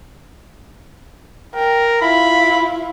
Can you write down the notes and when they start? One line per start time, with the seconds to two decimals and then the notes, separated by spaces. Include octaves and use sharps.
1.55 A#4 G5
2.01 E4 F4 B5